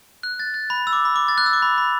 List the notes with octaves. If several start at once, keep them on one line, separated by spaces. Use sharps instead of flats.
F#6
A6
F#6
B5
E6
D6
B5
D6
A6
F#6
E6
D6
B5
B5